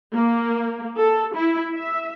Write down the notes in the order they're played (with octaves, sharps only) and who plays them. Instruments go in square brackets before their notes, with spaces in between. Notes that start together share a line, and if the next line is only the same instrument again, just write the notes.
[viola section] A#3
A4
E4
E5